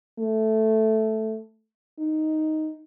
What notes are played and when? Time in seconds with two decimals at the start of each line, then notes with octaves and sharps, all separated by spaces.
0.19 A3
1.99 D#4